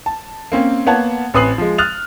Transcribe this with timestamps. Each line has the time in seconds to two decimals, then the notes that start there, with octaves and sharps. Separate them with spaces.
0.06 A5
0.52 A#3 C4 C#4
0.86 A#3 B3 C#5 F#5 A5
1.34 A1 C4 B4 D#6 C7 F#7
1.58 F3 G#3
1.78 D#6 F6 F#6 A6 F7